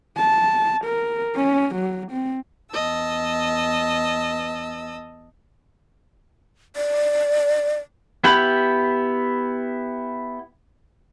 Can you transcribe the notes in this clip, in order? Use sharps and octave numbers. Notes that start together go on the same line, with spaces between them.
A5
A#4
C#4
F#3
C4
E2 D#5 A5 E6
D5
B3 E4 G4 B5